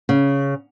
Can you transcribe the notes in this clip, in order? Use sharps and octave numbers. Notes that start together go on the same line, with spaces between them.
C#3